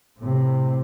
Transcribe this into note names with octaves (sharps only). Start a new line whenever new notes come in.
A2 C3